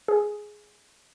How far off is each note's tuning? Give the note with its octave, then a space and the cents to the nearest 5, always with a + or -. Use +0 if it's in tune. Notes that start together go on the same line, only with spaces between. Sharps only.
G#4 +5